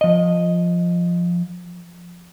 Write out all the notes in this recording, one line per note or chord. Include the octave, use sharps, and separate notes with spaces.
F3 D#5